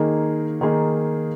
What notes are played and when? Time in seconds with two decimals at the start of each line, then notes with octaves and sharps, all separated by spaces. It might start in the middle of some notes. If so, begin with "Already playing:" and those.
Already playing: D#3 A#3 D#4 G#4
0.61 D#3 A#3 D#4 G#4